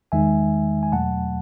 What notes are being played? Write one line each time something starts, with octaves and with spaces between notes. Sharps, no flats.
E2 D#3 G#3 D#4 E5 G#5
G#5
E2 B2 F#3 A3 F#5 A5